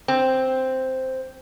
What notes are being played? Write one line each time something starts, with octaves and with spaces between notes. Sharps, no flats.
C4